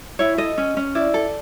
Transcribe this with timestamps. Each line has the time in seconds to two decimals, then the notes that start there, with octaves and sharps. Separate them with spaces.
0.19 E4 C#5
0.38 A4 D#5
0.58 C#4
0.77 C#4
0.95 E4 D5
1.14 A4